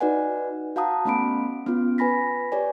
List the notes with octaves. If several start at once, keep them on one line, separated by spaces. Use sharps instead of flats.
D#4 F#4 B4 D5 F#5 G#5
F#4 F5 F#5 A5 A#5 D#6
A3 B3 C#4 F#5 B5 D7
B3 C#4 F4
B4 G#5 B5 A#6 B6
G4 B4 C#5 D5 G#5